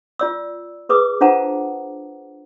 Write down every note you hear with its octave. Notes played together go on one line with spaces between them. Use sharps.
F4 D5 E6
G#4 B4 D6 D#6
D4 F4 C5 F#5 A5 A#5